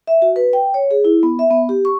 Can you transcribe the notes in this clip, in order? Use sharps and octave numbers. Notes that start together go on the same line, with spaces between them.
E5
F#4
B4
G5
C#5
G#4
E4
B3
E5
B3
G4
C#6